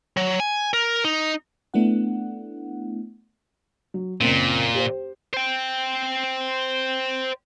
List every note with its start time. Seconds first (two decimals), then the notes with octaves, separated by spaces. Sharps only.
0.17 F#3
0.40 G#5
0.74 A#4
1.05 D#4
1.74 A3 B3 D4 E4 F#5
3.94 F#3
4.21 F#1 A#2 A#3 C4
4.75 G4 C5
5.34 C5 G5